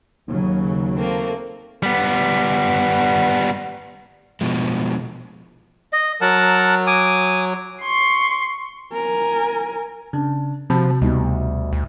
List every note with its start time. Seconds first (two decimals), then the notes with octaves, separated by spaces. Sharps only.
0.28 D#2 C#3 F#3
0.97 A3 A#3 C4
1.83 G3 B3
4.41 B2 F3 G#3
5.93 D#5
6.21 F#3 A#4 F#5 A5
6.87 G#5 D6 D#6
7.82 C6 C#6
8.93 A#4 G#5
10.13 C#3 D4
10.70 C3 F3 F#4 A5 B5
11.02 D2 B2 G3 D#4
11.73 D2